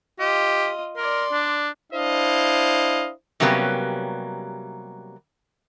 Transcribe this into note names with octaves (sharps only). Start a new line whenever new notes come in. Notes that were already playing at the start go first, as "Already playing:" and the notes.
F4 G4 D#5
A#4 D5 C6
D4
D4 E4 C5 D#5 F5
C3 F#3 G3 A#3 B3 C#4